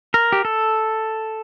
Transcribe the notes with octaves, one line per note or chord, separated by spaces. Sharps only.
A#4
G4
A4